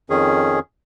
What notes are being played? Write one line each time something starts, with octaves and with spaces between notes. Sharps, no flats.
F2 D#3 C#4 G#4